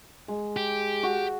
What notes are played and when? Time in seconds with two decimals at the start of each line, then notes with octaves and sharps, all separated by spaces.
0.28 G#3
0.57 G4
1.03 F#4